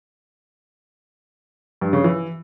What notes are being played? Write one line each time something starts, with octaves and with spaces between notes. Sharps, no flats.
G2
C#3
E3